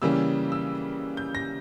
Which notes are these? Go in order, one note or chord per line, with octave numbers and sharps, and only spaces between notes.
C#3 E3 G3 A#3 C#4 E6
E6
G6
A#6